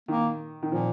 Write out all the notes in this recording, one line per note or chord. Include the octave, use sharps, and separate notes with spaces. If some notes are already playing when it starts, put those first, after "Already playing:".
D#3 A#3
D#3
A#2 F3